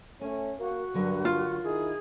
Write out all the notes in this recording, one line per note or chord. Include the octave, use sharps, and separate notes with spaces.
A3 C#4 G#5
A#3 F#4
G2 D3 F#3 A#4
F4
D#3 D#4 E4 G#4